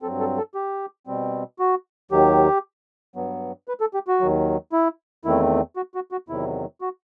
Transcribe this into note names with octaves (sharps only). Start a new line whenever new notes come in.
G2 F#3 C4 A4
A4
A4
G4
B2 G3 C4
F#4
D#2 D#3 F#3 G4
G2 F#3 B3
B4
A4
G4
F#4
D#2 D#3 F#3
E4
E2 D#3 A3 C4 E4
F#4
F#4
F#4
E2 C3 D#3 F#3 E4
F#4